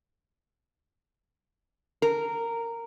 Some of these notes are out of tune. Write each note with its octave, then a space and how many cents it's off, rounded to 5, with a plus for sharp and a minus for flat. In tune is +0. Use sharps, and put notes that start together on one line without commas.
A#4 -10